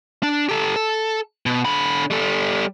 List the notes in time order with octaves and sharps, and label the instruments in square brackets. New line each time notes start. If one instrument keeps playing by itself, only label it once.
[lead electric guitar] D4
G4 A4
A4
B2
D3 B5
G3 A4